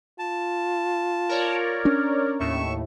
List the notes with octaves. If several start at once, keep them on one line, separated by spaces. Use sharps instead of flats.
F4 A5
A#4 C#5 D5
C#4 D4
D#2 A2 E5 C#6